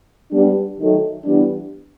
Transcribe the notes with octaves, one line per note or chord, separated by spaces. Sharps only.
G3 B3 D4
D#3 F#3 A3
E3 G3 B3 D4